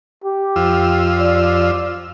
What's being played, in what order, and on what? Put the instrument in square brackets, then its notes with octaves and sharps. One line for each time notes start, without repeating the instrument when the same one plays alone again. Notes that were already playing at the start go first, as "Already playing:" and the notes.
[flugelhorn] G4
[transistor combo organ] F2 F4 E6
[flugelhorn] D5